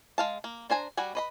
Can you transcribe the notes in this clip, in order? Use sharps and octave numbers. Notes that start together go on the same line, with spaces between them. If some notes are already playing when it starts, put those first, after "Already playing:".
G#3 F5 A5
A#3
D4 C5 G#5 A#5
G3 F#4 F#5 G#5
B4 D#5 B5